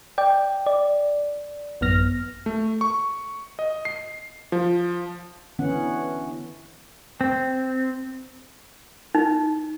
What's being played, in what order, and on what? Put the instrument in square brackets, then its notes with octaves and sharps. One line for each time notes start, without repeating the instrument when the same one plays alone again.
[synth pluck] D5 G5
D5
A1 F#2 B3 F6 A#6
[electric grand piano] A3
C#6
D#5
C7
F3
[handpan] D3 E3 B3 C#4 F#5
[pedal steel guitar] C4
[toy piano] D#4